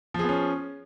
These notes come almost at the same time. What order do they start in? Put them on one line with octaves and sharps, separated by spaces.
F3 G#4 B3 C#4